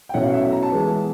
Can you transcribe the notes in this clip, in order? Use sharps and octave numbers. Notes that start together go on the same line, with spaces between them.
G5
B2 F#3 A3 C#4 E4 F#5
F5
E5
E5
A#5
A5
E3 G#3 B3